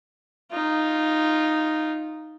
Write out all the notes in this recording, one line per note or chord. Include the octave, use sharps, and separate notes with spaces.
D#4 F4